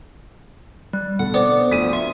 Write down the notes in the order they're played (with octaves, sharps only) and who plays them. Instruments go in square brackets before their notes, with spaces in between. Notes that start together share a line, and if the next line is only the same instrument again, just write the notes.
[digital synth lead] G3 [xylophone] F#6
[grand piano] B2 D3 A3 [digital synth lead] F#5
[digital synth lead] B3 [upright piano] C4 [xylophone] D5 D6
[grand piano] G1 D2 F3 [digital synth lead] D#6 [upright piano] B6 D#7
[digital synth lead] E5 [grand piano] C6